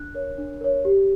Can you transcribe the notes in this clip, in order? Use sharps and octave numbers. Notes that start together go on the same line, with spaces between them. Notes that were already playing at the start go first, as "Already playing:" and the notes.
Already playing: D4 F#6
A#4 C#5
D4
A#4 C#5
G4